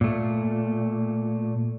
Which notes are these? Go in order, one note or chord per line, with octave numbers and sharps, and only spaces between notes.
A#2 A3